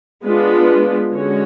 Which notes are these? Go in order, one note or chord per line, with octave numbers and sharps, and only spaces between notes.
G#3 B3 D4 F4 B4
D3 G#3 C#4 F#4 C#5